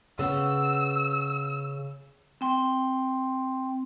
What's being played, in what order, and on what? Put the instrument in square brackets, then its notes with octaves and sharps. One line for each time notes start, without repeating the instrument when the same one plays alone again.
[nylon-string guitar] C#3 B3 [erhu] E6
[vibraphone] C4 G5 C6